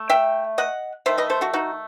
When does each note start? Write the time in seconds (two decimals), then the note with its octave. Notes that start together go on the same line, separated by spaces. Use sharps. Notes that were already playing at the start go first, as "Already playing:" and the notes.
Already playing: A3
0.10 E5 G5
0.58 D#5 F#5
1.06 D#3 A3 C5 E5
1.18 B4 D#5
1.30 A4 C5
1.41 F#4 A4
1.53 D#4 F#4